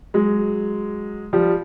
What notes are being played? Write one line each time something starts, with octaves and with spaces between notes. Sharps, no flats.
F#3 G#3
F3 G3